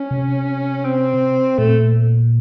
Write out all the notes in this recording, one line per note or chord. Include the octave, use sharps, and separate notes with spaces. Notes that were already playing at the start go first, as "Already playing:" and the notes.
Already playing: C#4
C3
C4
A#2 A3